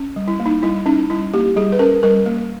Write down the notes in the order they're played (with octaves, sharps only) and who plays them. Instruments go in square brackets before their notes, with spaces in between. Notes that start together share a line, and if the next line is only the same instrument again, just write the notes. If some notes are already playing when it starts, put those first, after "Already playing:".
Already playing: [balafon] C#4
G3
E4
A#3
D#4
G3 E4
C#4 D#4
G3 E4
A#3 G4
G3 G#4
B4
C#4 A#4
G3 A#4
A#3